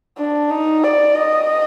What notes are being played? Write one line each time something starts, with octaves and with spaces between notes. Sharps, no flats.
D4
D#4
D5
D#5